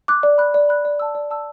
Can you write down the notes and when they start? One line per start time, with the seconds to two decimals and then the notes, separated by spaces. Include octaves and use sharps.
0.08 D6 F#6
0.23 D5
0.38 B5 F#6
0.54 D5
0.69 B5 F#6
0.85 D5
1.00 A5 E6
1.15 D5
1.31 A5 E6